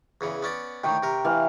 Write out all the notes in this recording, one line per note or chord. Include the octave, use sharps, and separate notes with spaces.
E2 C#3 E3
B3 C#4 D5
A2 D3 D#3 G5 C#6
C3 A#4
E3 F5